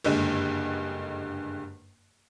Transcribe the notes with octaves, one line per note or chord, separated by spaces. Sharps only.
F#1 G2 D3 G#3